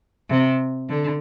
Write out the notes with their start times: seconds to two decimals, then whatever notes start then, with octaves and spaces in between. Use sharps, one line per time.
0.29 C3
0.89 D3